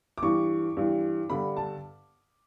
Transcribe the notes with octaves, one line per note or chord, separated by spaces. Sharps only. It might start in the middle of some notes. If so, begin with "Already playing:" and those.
D6
G2 E3 C#6
G2 E3
G2 D3 B5
A5